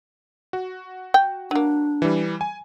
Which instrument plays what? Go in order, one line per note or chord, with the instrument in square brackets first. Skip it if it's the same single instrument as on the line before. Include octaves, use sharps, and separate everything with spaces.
[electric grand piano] F#4
[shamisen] G5
[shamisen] F#3 A#3 [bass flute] D4
[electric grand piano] E3 G3
G#5